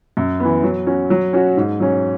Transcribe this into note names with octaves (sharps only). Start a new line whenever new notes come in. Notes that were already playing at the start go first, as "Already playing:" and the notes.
F#2
E3 B3
F#3
C#4 F#4
F#3
C#4 F#4
G#2
F#3 C#4